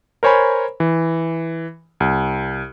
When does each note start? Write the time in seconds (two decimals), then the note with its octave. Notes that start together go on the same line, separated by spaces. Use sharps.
0.23 A#4 C5 C#5 G#5 B5
0.80 E3
2.00 C2